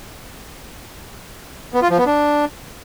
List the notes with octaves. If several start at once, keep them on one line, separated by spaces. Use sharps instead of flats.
B3
F4
F3
B3
D4